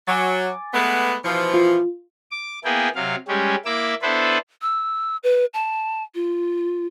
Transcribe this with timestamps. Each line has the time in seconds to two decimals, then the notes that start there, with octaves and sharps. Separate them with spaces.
0.07 F#3 G#5 D6 A6
0.74 G#3 A3 B3
1.24 B2 E3 F3
1.54 F4
2.31 D6
2.65 A#3 B3 E4 G#4 G5
2.95 C3 F#3 F5
3.28 G3 G#3 C#4 G4
3.66 A#3 E4 E5 D6 E6
4.02 B3 D4 E4 A4 B4 C5
4.62 E6
5.24 B4
5.54 A5
6.15 F4